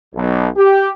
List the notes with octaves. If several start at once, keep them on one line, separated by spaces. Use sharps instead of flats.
B1
G4